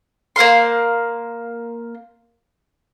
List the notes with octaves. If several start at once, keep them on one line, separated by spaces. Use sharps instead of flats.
A#3 C5 F5 C6